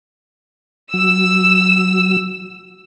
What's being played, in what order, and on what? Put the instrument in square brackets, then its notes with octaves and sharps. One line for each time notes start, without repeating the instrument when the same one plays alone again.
[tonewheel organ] F#3 [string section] E6